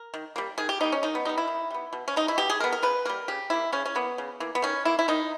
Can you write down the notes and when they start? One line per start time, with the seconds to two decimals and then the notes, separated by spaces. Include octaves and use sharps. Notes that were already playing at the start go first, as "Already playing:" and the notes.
Already playing: A#4
0.14 D#3
0.36 G3 A#3
0.58 D#3 G#4
0.69 G4
0.80 G3 A#3 D#4
0.92 C#4
1.03 D#3 D#4
1.15 B3
1.25 G3 B3 D#4
1.38 E4
1.48 D#3
1.71 G3 B3
1.93 B2
2.08 C#4
2.16 G#3 B3 D#4
2.28 E4
2.38 B2 G4
2.50 G#4
2.60 G#3 B3 A#4
2.72 A#4
2.83 C#3 B4
3.05 G3 A#3 A#4
3.28 C#3 G4
3.50 G3 A#3 E4
3.72 C#3 C#4
3.85 C#4
3.95 E3 A#3 B3
4.18 C#3
4.40 E3 A#3
4.55 B3
4.62 D#3 C#4
4.85 A#3 E4
4.99 E4
5.08 D#3 D#4